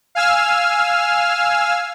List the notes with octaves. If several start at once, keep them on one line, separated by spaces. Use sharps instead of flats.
F5 G#5 E6 F6